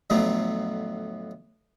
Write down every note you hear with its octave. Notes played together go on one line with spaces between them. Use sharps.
F2 A2 D3 F#3 A3 B3